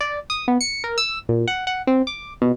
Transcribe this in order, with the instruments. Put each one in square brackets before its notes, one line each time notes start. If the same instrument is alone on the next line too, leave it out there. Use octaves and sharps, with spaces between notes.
[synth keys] D5
D#6
B3
C#7
A#4
E6
A#2
F#5
F#5
C4
D6
B2